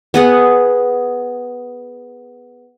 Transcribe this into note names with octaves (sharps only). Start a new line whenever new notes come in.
B3 G#4 F#5